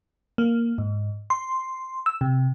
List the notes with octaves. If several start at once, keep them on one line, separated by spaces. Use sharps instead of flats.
A#3
G#2
C6
E6
C3